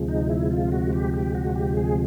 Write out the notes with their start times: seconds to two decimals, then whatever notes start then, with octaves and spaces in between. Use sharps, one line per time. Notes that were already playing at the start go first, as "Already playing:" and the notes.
Already playing: D2 C3 F3 G#3
0.09 D#4
0.29 E4
0.51 F4
0.72 F#4
0.93 G4
1.14 G4
1.35 F#4
1.56 G4
1.77 G#4